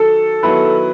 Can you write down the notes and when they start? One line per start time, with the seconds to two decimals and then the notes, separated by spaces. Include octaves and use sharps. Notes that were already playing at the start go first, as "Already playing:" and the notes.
Already playing: D#3 F#3 A4
0.43 D#3 F#3 B3 E4 B4